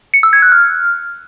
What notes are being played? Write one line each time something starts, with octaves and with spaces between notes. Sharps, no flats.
C#7
E6
G#6
F#6
F6